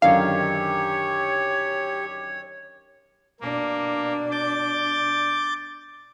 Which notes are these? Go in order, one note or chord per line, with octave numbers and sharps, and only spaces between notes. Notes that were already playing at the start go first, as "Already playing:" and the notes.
F#2 D3 D#3 G4 C#5 F5
B2 A#3 D4
D6 G6 A6